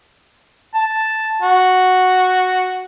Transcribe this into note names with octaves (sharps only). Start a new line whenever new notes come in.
A5
F#4